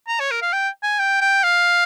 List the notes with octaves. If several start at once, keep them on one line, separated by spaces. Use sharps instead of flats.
A#5
C#5
A#4
F5
G5
G#5
G5
G5
F5